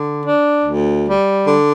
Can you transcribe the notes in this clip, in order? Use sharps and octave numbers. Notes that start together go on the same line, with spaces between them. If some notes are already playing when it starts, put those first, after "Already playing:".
Already playing: D3
D4
D2
G3
D3